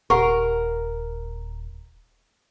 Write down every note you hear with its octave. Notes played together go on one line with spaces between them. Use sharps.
D#1 G4 A#4 F#5 C#6